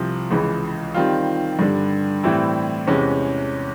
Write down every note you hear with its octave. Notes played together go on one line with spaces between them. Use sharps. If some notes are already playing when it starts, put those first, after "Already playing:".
Already playing: C2 C3 F3
C#2 C#3 E3
D#3 G3 C4 F4
G2 D3 G3
A2 E3 G3 C4 E4
E2 C3 E3 G#3 C#4